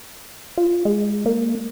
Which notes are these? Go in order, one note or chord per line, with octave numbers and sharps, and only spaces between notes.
F4
G#3
A#3